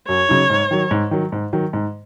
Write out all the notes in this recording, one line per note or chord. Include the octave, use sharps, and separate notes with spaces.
F#2 C#5
C#3 F#3 D#4
G#2
D#3 F#3
G#2
D#3 F#3
G#2
D#3 F#3
G#2